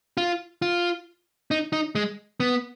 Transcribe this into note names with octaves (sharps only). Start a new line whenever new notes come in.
F4
F4
D#4
D#4
G#3
B3